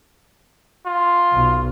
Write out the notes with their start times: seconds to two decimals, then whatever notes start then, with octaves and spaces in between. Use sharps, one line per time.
0.86 F4
1.32 B1